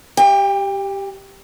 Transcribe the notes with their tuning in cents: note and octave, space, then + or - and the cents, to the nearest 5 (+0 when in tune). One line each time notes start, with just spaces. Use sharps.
G4 -5 G5 +35